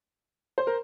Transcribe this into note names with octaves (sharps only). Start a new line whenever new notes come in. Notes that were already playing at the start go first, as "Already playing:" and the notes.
C5
A#4